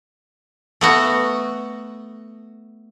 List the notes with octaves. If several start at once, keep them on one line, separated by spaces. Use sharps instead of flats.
A3 B3 F#4